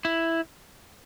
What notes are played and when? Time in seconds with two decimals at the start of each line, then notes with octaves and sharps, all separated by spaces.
0.05 E4